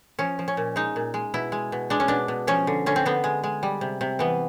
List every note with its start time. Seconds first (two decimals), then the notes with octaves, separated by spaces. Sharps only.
0.19 F3 C#4
0.39 F3
0.48 C#4
0.57 A#2
0.76 G#3 D#4
0.96 A#2
1.14 G#3
1.34 B2 E4
1.52 G#3
1.72 B2
1.90 G#3 D4
2.00 C#4
2.08 B2 D4
2.28 B2
2.47 F3 C#4
2.67 D3
2.86 D3 C#4
2.96 C4
3.05 D3 B3
3.24 G#3
3.44 G#3
3.63 G3
3.81 C3
4.01 C3
4.19 E3 B3